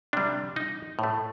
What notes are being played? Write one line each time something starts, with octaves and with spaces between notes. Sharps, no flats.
C3 G3 D4
D#4
A2 A3